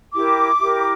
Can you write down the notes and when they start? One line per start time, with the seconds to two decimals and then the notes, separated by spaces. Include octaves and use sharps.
0.14 E4 G4 A#4 D6
0.58 E4 G4 A#4